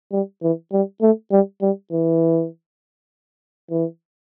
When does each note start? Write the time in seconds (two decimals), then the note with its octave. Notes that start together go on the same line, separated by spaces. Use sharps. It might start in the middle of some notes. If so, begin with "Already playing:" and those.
0.12 G3
0.43 E3
0.73 G3
1.01 A3
1.31 G3
1.62 G3
1.92 E3
3.71 E3